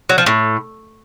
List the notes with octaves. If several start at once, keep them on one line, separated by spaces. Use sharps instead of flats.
F#3
F3
A2